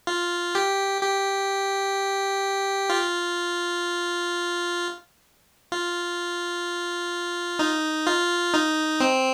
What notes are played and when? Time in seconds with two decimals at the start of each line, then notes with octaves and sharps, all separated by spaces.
0.07 F4
0.55 G4
1.01 G4
2.90 F4
5.72 F4
7.59 D#4
8.07 F4
8.54 D#4
9.00 C4